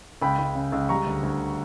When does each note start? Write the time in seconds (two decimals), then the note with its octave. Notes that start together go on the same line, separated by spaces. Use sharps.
0.22 C#2 G5 B5
0.39 C#2
0.55 C#3
0.72 C#2
0.89 G3 A#5 C#6
1.06 D2
1.23 D2